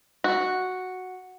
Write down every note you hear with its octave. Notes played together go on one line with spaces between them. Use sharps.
F#4